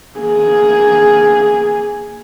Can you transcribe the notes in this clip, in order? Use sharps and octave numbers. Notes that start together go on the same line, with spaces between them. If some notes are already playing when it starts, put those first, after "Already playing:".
A#3 G#4